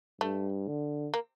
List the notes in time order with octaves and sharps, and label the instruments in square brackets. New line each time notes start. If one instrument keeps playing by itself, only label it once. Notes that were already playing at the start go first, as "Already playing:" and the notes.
[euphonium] G2 [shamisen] A3
[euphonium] D3
[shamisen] A#3